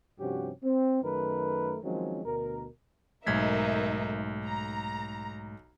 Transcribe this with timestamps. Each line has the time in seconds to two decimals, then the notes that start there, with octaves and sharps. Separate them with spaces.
0.20 G2 C3 F3 C#4 F#4 G4
0.63 C4
1.02 F#2 D#3 A3 A#4 B4
1.83 D#3 F3 F#3 G#3 C4 C#4
2.25 D2 B2 A#4
3.27 B1 G#2 A3 D#4 A#4 E5 G#6 B6
4.46 A#5